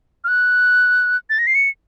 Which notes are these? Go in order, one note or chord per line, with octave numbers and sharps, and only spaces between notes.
F6
F#6
A6
A#6
C7
C#7